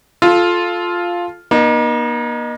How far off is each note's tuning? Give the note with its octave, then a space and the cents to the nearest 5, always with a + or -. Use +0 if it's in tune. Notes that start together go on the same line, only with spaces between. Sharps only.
F4 +0 A4 -15
A#3 +40 D#4 -20